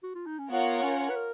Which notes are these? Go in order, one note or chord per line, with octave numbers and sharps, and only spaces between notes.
F#4
F4
D#4
C#4
B3 F4 A#4 C#5 F#5
C#4
B4
A#4